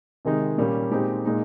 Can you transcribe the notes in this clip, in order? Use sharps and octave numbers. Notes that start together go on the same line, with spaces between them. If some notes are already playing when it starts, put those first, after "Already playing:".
C3 D#3 G#3 D#4
A#2 G3 A#3 C#4
A#2 G#3 C4 D#4 G4
A#2 G#3 D#4